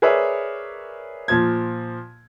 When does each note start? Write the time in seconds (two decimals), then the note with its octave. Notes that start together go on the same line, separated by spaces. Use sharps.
0.02 G#4 A#4 B4 C#5 D5 E5
1.28 A#2 F3 G#6